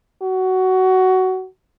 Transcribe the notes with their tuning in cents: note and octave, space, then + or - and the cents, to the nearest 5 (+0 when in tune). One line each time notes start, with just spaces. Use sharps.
F#4 +15